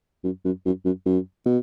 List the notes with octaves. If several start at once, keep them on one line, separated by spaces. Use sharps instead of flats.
F#2
F#2
F#2
F#2
F#2
B2